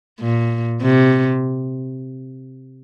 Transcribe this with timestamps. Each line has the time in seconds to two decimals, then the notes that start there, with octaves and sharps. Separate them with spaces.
0.20 A#2
0.81 C3